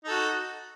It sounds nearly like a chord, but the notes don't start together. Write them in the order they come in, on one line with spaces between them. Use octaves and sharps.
D#4 A4 F#4